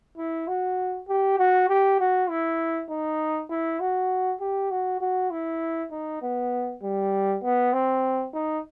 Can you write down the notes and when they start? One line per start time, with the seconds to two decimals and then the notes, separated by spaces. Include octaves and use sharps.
0.18 E4
0.48 F#4
1.09 G4
1.39 F#4
1.69 G4
2.00 F#4
2.30 E4
2.90 D#4
3.50 E4
3.80 F#4
4.41 G4
4.71 F#4
5.01 F#4
5.31 E4
5.91 D#4
6.22 B3
6.83 G3
7.43 B3
7.73 C4
8.34 D#4